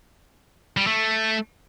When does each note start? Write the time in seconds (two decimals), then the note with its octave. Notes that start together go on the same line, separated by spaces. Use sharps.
0.77 G3
0.87 A3